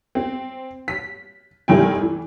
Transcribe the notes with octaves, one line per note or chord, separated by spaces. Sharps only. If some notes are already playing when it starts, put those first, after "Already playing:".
C4
B6
F1 D#3 G3 E4 G5 G#5
E3